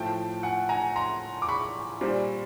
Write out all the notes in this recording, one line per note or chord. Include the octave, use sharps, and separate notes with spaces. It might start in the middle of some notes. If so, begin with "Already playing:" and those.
Already playing: A2 F3 A3 G5 A5
F#5 G#5
G#5 A#5
A#5 C6
D6
B5 C#6
A#2 G3 C4